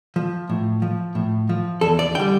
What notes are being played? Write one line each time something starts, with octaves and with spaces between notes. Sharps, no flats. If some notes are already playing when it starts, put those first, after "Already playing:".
F3
A2
F3
A2
F3
E2 A4
D5
D3 G3 G5